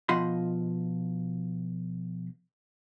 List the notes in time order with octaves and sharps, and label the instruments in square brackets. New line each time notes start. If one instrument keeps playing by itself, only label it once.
[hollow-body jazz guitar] B2 F3 F4 D#5 B5 C6